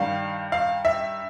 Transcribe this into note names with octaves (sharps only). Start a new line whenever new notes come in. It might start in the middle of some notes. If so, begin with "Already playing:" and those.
Already playing: G2 D#3 G3 F5
F5
E5